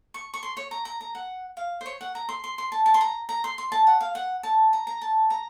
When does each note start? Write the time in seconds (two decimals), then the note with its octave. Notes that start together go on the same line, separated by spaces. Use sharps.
0.14 C#6
0.34 C#6
0.43 C6
0.57 C#5
0.71 A#5
0.85 A#5
1.01 A#5
1.15 F#5
1.57 F5
1.81 C5
1.86 C#5
2.01 F#5
2.15 A#5
2.29 C6
2.44 C6
2.58 C6
2.72 A5
2.86 A5
2.94 C6
3.01 A#5
3.29 A#5
3.44 C6
3.58 C6
3.72 A5
3.87 F#5
4.00 F5
4.15 F#5
4.43 A5
4.73 A#5
4.87 A#5
5.02 A5
5.30 A#5